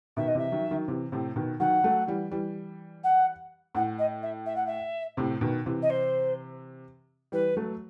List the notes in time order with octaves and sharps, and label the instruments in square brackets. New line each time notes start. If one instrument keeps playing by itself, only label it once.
[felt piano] B2 D#3 [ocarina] E5
[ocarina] D#5
[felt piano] C3 E3 [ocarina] E5
[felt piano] D#3 F#3
D#3 F#3
C3 E3
A2 C3
B2 D#3
[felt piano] D#3 F#3 [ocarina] F#5
[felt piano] F#3 A3
E3 G3
E3 G3
[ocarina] F#5
[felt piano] A2 [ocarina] F#5
[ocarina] D#5
E5
E5
F#5
E5
[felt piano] A2 C3
B2 D#3
C3 E3
[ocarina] D#5
C5
[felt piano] E3 G3 [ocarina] B4
[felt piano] F#3 A3